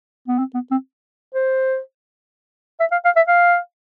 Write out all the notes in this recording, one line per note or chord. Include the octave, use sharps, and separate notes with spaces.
B3
C4
B3
C4
C5
E5
F5
F5
E5
F5